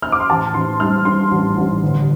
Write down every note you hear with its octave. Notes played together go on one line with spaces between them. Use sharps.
F6
D6
C6
A1 A5
A1 C6
G3 F6
G2 C6
A1
A1
G1